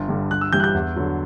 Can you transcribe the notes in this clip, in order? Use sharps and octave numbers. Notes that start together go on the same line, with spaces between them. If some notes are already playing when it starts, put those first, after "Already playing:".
Already playing: G1
G2 D3 G3
G1 F#6
E6
G2 E3 G3 G6
F#6
G6
E2
D3 F#3